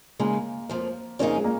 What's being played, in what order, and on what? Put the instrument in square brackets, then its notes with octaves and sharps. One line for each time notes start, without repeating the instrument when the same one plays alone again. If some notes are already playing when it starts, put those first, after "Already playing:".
[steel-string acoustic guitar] C#3 G#3 D#4 [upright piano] A#3
[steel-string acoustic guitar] F2 F3 A#3
[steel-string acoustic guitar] F2 C#3 A#3 D#4 G#4 [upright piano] C#4
[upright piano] G#3
A#3